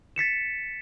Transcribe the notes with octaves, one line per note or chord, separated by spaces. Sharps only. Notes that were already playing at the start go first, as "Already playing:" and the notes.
A6 B6 C#7 E7